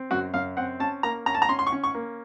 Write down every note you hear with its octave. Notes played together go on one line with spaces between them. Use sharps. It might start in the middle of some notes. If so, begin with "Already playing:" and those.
Already playing: C4
F#2 F#4
F#2 F5
C4 F#5
C#4 A5
A#3 A#5
C#4 A#5
A5
A#5
C#4 C6
C6
C#6
C#4
C#6
A#3